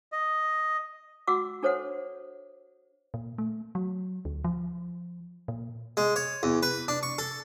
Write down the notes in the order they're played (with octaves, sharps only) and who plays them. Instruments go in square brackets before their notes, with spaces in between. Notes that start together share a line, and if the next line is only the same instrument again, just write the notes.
[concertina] D#5
[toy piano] F#4 F#5 D6 E6
D4 A4 C5 C#5 F#5
[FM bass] A#2
A3
F#3
D2
F3
A#2
[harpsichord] G#3
C#5
E2
B4
D4
C#6
A4